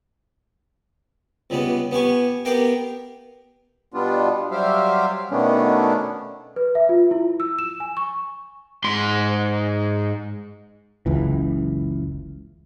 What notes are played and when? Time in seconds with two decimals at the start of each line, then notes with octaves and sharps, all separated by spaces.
1.50 C#2 C#3 G3 B3
1.91 B3 G4 G#5 C#6
2.45 B3 G4 A#4 F5 G5
3.94 B2 G3 B3 D4 F4
4.51 F#3 G3 G4 C5 E5 F5
5.31 B2 D#3 A3 B3 C#4 D4
6.56 B4
6.75 E5
6.89 F4
7.11 E4
7.40 E6
7.59 E7
7.80 G#5
7.97 C#6
8.84 G#2 C6
11.06 F#1 C#2 E3